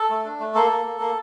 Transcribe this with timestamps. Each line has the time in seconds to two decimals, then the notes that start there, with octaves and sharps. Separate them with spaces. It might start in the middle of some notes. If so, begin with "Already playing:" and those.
Already playing: A4
0.09 A3
0.25 D4
0.40 A3
0.55 A#3 A4
0.70 A#3
0.85 A#3
1.00 A#3